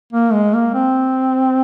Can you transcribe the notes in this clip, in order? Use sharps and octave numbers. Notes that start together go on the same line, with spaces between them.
A#3
G#3
A#3
C4